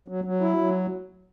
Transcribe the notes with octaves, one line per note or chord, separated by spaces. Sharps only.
F#3
F#3
E4
F#3